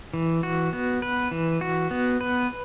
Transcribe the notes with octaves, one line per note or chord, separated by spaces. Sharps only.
E3
F#4
B3
B4
E3
F#4
B3
B4